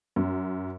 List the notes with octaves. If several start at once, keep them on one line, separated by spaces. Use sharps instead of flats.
F#2